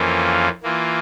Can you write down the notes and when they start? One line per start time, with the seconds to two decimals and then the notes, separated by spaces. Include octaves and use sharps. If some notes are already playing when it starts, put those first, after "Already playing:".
Already playing: F2 E3 A#3 C#4 F4
0.63 E3 A#3 F4